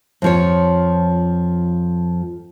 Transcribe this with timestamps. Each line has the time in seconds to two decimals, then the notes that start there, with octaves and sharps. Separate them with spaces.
0.22 F2 F3 C#5